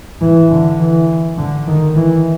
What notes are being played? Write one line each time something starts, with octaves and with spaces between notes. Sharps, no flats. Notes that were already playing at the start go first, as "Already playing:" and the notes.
E3
D3
E3
D3
D#3
E3